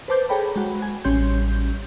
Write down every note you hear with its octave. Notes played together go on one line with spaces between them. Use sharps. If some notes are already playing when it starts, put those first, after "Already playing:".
B4 C5 A5 D6 G6
G#4 A4 C#5 G5 A#5 B5
G#3 F#4
G#5
A1 G3 C#4 C#5 C6 G6